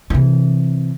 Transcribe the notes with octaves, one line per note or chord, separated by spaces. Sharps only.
C3 E3